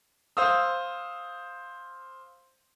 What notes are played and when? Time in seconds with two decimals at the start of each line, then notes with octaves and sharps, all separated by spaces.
0.37 C5 F5 D#6 E6